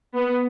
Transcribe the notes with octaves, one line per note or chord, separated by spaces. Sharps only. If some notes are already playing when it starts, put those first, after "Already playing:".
B3